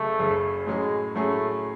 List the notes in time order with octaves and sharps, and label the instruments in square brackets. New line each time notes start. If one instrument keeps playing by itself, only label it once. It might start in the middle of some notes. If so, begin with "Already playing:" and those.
Already playing: [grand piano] F#1 F#2 C#3 [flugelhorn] A3
[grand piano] F#1 F#2 C#3
[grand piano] A2 F#3 C#4 G#4 [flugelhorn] G#3
[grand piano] A2 F#3 C#4 G#4 [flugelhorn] A3